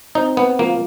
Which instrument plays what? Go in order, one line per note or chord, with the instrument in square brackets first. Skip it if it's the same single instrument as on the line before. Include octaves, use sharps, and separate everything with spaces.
[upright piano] C4 [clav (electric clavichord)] D#4
[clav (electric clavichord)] B3
[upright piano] F3 [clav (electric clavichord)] A#3